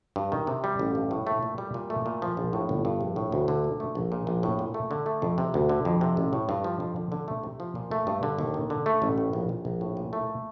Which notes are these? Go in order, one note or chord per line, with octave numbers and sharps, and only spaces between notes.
G2
D#3
C3
G3
A1
G2
A2
A3
A#2
G3
A#2
A3
A#2
F3
A#1
A2
G1
G2
A#1
A2
D2
D3
A#2
A3
A#1
A#2
A#1
A2
A#2
A3
D3
A3
F2
C3
D2
D3
F2
C3
A1
A2
G2
F3
F2
D3
D3
A3
C3
F3
A#2
A3
G2
D3
D#2
D#3
D3
A3
A1
A2
A#1
A#2
A#1
A2
A#2
A3